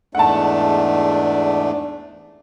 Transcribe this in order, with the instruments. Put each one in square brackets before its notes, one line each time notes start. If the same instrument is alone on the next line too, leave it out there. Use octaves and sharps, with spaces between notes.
[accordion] E2 G#2 A3 [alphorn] D4 [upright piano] F#5 A5